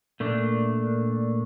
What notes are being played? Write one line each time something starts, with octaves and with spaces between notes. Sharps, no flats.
A#2 A3 D4